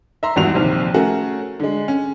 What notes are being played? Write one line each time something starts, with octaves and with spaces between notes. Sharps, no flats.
E5 A#5 C6
G#1 E2 G2 F#4 F7
A#1 D#2 C3
A3 C#4 F#4 G#4 A#4
D3 G#3
C#4